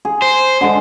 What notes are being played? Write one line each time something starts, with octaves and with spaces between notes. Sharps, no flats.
G#4
C5
D3 G#3